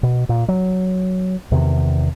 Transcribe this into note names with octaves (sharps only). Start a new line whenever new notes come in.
B2
A#2
F#3
E2 C3 D#3